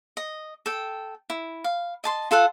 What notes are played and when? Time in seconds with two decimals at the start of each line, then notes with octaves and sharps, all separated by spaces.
0.17 D#5
0.66 A4 G5
1.30 E4
1.64 F5
2.04 D#5 A5 C6
2.31 F4 A4 F5 F#5